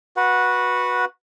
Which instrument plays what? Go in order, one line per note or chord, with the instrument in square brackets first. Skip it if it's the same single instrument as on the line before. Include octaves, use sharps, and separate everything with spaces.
[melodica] F#4 B4 F#5